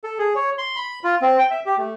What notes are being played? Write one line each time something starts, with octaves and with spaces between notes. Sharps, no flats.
A4
G#4
C#5
C6
B5
F4
C4
G5
E5
G4
A3